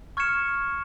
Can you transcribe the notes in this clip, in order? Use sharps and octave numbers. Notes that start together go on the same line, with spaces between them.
C#6 F6 G#6 C#7 E7